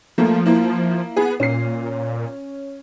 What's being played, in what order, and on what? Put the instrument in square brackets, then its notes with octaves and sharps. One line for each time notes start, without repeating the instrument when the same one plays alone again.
[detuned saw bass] F3 [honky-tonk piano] A3 A#3
[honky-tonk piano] A#3 E4
[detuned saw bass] B3 [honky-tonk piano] G#4
[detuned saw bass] A#2 [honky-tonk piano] C#4 C7